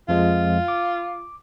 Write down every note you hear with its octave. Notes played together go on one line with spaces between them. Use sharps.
F2 F3 G#3 F4
D6